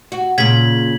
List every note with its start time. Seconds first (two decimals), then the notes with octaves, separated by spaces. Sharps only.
0.12 F#4
0.38 A#2 C#3 G#6 B6 F#7